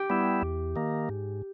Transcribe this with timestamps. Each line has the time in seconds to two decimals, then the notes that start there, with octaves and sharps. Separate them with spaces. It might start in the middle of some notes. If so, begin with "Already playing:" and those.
Already playing: G4
0.10 G3 B3 E4
0.42 E2
0.76 D#3 A#3
1.09 G#2